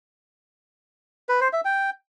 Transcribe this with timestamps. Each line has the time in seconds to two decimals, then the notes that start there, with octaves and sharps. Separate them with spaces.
1.29 B4
1.41 C5
1.53 E5
1.65 G5